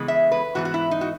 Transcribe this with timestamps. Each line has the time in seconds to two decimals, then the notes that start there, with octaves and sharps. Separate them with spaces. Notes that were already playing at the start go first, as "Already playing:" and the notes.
Already playing: C#3 E3 G#3 B3
0.08 E5
0.31 B4
0.55 G#2 E3 B3 F#4
0.65 F#4
0.74 E4
0.91 D#4
1.01 F#4